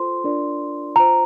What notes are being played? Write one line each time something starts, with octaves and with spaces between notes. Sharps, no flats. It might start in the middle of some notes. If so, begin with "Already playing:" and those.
Already playing: F4 A4 C5 C6
D4 F4 A#4 D5
F4 C5 A#5